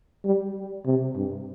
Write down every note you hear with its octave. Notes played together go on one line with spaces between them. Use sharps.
G3
C3
G2